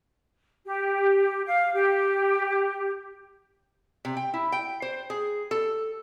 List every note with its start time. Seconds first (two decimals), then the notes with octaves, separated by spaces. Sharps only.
0.66 G4
1.47 F5
1.74 G4
4.05 C3
4.17 G5
4.34 E4
4.52 G5
4.82 C5
5.10 G#4
5.51 A4